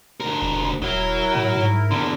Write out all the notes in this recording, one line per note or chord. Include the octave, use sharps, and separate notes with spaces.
D2 A#4
E1
D#1 F#3 E4 A#4
A2
G#2
E2 D3